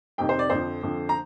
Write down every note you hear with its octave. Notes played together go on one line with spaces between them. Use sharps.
F2 C3 D#3 G5
C5
D5
F2 D3 F3 C5
F2 D3 F3
A#5